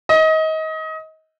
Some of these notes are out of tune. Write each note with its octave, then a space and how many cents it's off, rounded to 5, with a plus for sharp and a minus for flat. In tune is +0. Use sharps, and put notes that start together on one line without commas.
D#5 +25